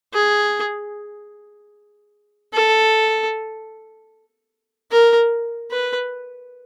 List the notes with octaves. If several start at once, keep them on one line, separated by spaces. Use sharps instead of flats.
G#4
A4
A#4
B4